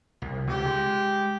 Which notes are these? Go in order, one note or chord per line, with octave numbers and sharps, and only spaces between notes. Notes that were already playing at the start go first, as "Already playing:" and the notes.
C2
C#2 C3 G4
G#3